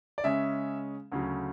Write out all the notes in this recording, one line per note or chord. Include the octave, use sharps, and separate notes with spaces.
D5
C#3 G#3 C#4 E5
D2 C#3 F#3